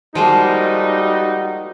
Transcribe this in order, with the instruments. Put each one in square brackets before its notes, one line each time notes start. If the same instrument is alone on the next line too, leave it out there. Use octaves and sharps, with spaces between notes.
[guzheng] F3 G#3 A#3 [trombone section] G3 D#4 F#4